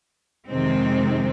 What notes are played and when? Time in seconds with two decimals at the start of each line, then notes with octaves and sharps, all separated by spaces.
0.48 F2 C3 D#3 G#3 C4